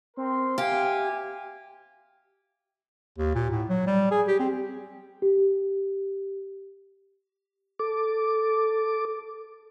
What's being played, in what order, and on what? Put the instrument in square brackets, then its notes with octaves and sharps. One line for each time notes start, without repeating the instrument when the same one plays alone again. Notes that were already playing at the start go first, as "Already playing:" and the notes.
[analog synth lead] C4 [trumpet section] A#4 C6
[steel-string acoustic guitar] G4 [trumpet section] E5 G5 G#5 [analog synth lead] F5
[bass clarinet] D#2
A#2
A2
F#3
G3
G#4
G4
C4
[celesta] G4
[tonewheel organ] A4 D6